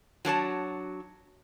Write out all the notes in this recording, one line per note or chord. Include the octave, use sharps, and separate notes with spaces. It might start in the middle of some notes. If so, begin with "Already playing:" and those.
F#3 D4 C#5 A5